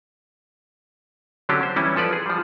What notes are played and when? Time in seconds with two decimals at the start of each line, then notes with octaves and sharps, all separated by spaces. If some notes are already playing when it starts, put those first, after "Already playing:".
1.49 D3 F#3 C#4 D4 G4
1.63 C5
1.76 E3 G3 C#4 E4
1.96 F3 A4 B4 D5
2.13 G#4
2.26 F3 G3